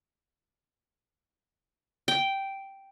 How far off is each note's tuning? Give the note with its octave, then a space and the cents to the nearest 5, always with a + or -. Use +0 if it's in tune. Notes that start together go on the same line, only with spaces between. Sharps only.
G5 -5